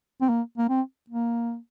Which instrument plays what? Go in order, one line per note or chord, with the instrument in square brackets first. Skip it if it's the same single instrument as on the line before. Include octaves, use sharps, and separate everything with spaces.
[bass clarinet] C4
A#3
A#3
C4
A#3